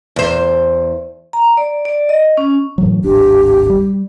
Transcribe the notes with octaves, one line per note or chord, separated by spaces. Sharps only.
E2 C5
A#5
D5
D5
D#5
C#4
A2 E3 F#3
D1 G#1 D4 G4
G3